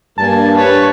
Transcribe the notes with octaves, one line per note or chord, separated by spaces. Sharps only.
G2 A#3 G#5 A5
B4 C#5